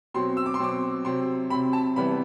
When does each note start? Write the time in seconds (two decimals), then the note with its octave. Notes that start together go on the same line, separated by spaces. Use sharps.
0.14 B2 F#3 C4 C6
0.37 E6
0.46 D6
0.54 C6
0.59 B2 F#3 C4 D6
1.05 C3 F#3 C4 C6
1.50 C3 F#3 C4 B5
1.73 A5
1.96 C3 E3 G3 B3 B5